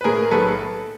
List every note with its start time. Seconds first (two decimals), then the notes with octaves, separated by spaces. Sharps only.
0.01 B4
0.04 A2 G#4 A#4
0.31 B1 A4 B4